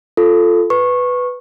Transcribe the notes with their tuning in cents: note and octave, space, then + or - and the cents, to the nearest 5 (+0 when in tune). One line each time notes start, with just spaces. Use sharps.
F4 +0 A4 +0
B4 +5 C#6 -15